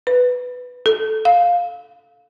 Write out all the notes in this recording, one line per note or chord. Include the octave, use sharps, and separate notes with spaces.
B4
A4
F5